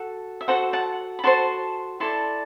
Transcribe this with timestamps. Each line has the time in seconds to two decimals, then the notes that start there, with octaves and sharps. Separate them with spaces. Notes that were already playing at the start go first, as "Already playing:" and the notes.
Already playing: F#4 A4
0.41 E5
0.48 F#4 A4 C5 F#5
0.73 F#5 A5
1.19 B5
1.24 F#4 A4 C5 A5 C6
2.00 E4 A4 D5 A5 C6